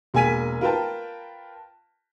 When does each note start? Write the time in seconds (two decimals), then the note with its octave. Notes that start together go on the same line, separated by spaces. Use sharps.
0.14 E1 A#3 G#4 G#5 B6 D#7
0.61 F4 A#4 B4 G5 A5